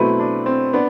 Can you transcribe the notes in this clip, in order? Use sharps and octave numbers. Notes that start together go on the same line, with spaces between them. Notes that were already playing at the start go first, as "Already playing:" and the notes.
Already playing: B2 F#3 A3 C4 E4 B4
D4
C4
B3 D4